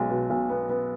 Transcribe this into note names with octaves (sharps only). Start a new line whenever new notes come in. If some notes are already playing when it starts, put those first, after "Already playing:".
Already playing: B1 G#3
B2
B1
B3
B3